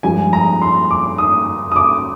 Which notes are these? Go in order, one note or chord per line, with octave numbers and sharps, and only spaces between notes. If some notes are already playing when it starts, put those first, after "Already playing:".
G2 F3 G#3 G#5
A#5
C6
D6
D#6
D#6
D6